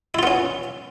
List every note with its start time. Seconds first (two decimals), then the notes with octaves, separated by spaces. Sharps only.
0.14 E4
0.19 F4
0.23 B3
0.27 C#4